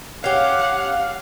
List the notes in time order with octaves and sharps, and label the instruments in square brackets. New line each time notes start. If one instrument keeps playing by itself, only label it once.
[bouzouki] C#4 G4 [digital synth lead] F5 [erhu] F#5